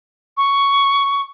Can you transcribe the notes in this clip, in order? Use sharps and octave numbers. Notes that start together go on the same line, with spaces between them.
C#6